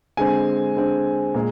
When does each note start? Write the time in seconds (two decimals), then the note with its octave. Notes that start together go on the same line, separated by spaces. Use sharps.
0.17 D3 G#3 C4 G#5
0.76 D3 G#3 C4
1.34 A#2 G#3